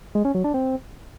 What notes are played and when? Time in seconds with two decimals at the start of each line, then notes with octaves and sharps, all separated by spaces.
0.15 G#3
0.25 C#4
0.35 F#3
0.44 D4
0.54 C4